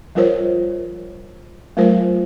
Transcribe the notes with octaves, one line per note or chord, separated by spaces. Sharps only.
F3 G3 F4 A#4 C5 C#5
F#3 A3 F4 A#4 C5